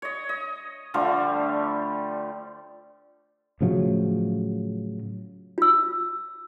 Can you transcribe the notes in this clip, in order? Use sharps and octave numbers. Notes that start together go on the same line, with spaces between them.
C#5 D#5
D#5
D3 F3 G3 A3
A2 C#3 F3 F#3
F4 E6